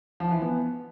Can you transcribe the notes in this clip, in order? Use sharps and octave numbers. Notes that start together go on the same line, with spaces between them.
F3
E3
B3